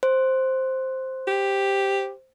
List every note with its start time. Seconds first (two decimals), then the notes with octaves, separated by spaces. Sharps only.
0.03 C5
1.28 G4